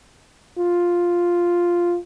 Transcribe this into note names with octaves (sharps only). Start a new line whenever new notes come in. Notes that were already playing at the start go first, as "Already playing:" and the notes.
F4